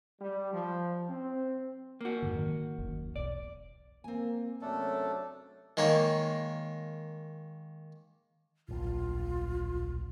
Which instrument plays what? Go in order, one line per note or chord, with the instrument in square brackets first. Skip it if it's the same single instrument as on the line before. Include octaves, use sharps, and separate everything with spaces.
[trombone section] G3
F3
C4
[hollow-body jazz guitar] A#3 F#4
[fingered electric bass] F2 G#2 D3
D3 D#3
F#1 D#2
[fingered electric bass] E1 B1 [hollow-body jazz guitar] D5
[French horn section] A#3 [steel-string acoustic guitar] C4 G#5
[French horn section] F#2 C3 C#5 [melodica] A3 D4 A4
[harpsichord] D#3 G#3 A#3 C#5
[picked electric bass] D1 A#1 [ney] F4